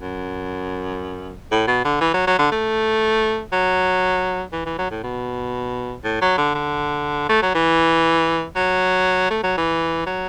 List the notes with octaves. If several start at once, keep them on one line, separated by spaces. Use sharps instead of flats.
F#2
A2
B2
D3
E3
F#3
F#3
D3
A3
F#3
E3
E3
F#3
A2
B2
A2
F#3
D3
D3
A3
F#3
E3
F#3
A3
F#3
E3
F#3